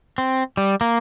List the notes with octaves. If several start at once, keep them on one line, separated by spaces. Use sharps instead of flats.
C4
G3
A#3